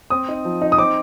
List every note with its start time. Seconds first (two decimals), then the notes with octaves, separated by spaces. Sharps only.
0.10 C4 D#6
0.28 D#4
0.45 F3
0.62 D#4
0.72 D#6
0.78 C4 D6